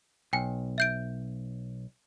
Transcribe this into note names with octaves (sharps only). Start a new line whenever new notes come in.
B1 G5 G#5
E5 G6 D7